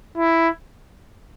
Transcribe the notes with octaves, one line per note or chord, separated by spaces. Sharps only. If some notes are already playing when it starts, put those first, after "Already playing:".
E4